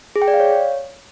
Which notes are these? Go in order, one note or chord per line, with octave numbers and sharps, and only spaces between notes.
G#4
G5
D5
F5
C#5